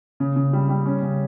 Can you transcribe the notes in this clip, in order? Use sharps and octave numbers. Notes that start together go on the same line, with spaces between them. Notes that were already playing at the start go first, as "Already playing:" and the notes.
C#3
C#3
G3
G3
C#4
C#3